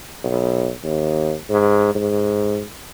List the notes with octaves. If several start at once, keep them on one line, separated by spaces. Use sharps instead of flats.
B1
D#2
G#2
G#2